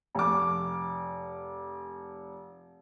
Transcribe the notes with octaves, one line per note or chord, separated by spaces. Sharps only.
F1 D6